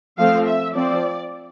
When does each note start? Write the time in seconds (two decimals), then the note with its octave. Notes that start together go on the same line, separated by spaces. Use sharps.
0.19 F3 A3 C4 F5
0.47 E5
0.75 F3 C4 D5